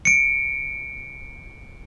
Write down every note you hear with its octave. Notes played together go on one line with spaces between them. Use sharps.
C#7 D7